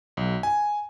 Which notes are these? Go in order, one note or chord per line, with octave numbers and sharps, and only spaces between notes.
B1
G#5